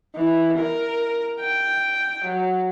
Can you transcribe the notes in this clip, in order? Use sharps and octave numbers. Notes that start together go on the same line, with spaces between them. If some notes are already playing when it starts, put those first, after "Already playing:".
E3
A#4
G5
F#3